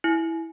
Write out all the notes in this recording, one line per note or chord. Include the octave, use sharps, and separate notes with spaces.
E4